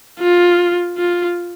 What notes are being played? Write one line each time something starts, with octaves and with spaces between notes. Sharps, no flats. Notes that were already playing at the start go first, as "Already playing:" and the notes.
F4
F4